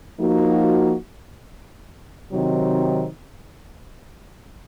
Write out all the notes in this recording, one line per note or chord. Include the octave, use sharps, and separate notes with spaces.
F3 A#3 D#4 F#4
C3 D#3 F#3 C4 D#4